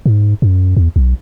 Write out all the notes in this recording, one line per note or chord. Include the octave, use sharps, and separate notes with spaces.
G#2
F#2
E2
B1